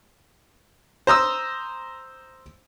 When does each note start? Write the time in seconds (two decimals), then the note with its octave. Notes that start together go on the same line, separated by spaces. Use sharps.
1.07 C5 A#5 D#6 E6